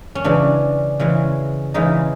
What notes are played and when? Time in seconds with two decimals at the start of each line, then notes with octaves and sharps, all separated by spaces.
0.15 C#4
0.24 C#3 E3 G#3 D4
0.99 C#3 E3 G#3
1.74 C#3 E3 G#3 D#4